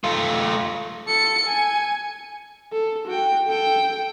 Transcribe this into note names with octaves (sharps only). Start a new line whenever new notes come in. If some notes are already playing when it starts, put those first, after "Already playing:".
A3 F4
A4 C#7
G#5
A4
F#4 G5
A4 G5